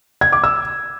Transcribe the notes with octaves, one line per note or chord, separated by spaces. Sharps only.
G#6
D6
E6